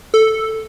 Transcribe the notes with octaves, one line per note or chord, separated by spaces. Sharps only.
A4